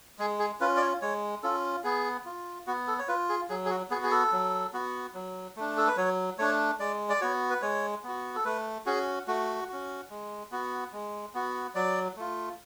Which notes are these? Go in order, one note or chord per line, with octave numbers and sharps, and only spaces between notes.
G#3 G#4
G#4
C#4 F4 B4
D5
C#5
G#3 C#5
C#4 F4 A4
B3 G#4
F4
B3 F#4
A4
C#5
F4 B4
G#4
F#3 G#4
G#4
F#4
B3 F#4 G#4
G#4
A4
F#3
B3 F#4
F#3
A3 D4
A4
B4
F#3 C#5
A3 D4 C#5
G#3 D5
D5
B3 F#4 C#5
B4
G#3 C#5
B3 F#4
A4
A3 B4
C#4 F#4 G#4
A3 F#4
C#4 F#4
G#3
B3 F#4
G#3
B3 F#4
F#3 D5
A3 F4